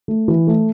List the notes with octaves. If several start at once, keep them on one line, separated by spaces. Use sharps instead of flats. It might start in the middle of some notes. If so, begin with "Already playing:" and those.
A3
E3
A3